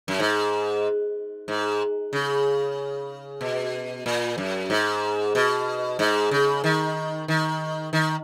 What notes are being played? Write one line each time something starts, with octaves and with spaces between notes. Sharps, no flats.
F#2
G#2
G#2
C#3
B2
A#2
F#2
G#2
B2
G#2
C#3
D#3
D#3
D#3